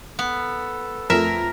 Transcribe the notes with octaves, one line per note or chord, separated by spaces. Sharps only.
B3 A4
F2 A3 A#4 E5 A#5